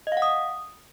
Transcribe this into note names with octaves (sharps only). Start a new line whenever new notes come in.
D#5
F5
F#5
D#6